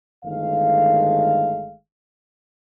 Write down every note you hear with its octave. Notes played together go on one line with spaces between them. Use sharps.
G1 D#3 G#3 A3 F5